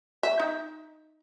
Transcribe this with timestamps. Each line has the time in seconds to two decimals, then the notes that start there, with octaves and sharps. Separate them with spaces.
0.23 E5
0.40 D#4